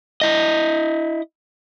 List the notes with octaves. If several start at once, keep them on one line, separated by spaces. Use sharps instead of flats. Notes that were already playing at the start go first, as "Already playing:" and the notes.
E4 D#5